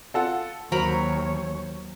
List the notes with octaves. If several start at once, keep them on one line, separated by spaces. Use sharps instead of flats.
F4 A4 F#5
D#2 F#3 A#4 C5 C#5 B5